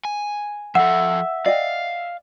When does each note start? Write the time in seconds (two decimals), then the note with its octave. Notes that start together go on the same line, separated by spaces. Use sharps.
0.05 G#5
0.75 F3 A4 E5 F#5
1.46 D5 D#5 F5 G5